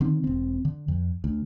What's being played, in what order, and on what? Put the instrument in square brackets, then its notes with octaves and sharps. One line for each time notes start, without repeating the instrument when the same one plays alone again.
[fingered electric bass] D3 D#3 C4
E1 C4
D3
F2
D2